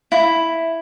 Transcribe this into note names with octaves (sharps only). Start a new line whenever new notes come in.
E4